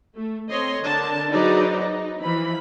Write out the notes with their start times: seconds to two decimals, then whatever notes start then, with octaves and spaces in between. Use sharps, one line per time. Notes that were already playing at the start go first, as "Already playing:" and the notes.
0.17 A3
0.49 C4 A4 C#5 D#5 C6
0.82 D3 D4 A#4 A5
1.30 F#3 D#4 G#4 B4 C5 D5
1.82 D#4
2.22 E3 F3 B5